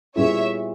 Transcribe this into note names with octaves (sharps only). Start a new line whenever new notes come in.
A#2 G3 B3 E4 G#4 C#5 E5